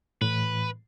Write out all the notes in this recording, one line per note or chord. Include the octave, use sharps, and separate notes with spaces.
A2 E3 B4